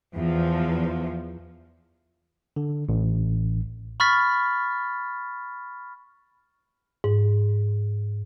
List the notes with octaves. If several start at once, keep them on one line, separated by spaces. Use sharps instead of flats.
E2 F3
D3
A1
B5 C#6 F6 A6 B6
G#2